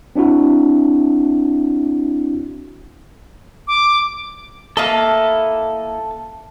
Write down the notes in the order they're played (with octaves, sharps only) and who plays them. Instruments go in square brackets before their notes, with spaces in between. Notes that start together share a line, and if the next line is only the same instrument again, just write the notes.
[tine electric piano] C4 D4 E4 F#4
[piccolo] D6
[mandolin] A#3 E4 D#5 [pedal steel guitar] A4 A5